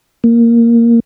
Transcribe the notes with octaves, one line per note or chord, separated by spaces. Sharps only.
A#3